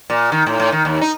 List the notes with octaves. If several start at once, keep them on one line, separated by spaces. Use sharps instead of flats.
A#2
D#3
A2
A2
D#3
D#2
D#4